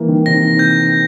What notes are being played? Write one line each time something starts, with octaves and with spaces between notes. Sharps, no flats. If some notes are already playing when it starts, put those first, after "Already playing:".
Already playing: E3 A#3
D#3
C3 A#6
G6